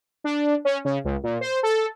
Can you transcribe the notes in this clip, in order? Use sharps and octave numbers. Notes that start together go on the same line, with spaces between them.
D4
C#4
C#3
C#2
A#2
C5
A4